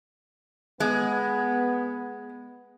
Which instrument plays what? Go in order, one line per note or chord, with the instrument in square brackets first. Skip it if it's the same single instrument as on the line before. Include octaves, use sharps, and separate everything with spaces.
[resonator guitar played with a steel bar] G#3 [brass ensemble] B3